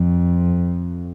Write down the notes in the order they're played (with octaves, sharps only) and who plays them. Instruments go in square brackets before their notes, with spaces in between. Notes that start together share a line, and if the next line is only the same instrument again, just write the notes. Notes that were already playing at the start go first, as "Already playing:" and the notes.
Already playing: [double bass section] F2